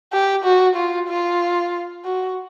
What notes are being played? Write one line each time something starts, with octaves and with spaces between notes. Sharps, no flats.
G4
F#4
F4
F4
F#4